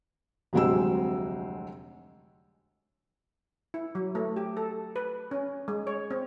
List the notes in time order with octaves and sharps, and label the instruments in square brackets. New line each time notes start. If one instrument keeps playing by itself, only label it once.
[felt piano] F1 D2 F#3 G#3 C4 E6
[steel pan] E4
F#3
A3
G4
A4
B4
C#4
G#3
C#5
C4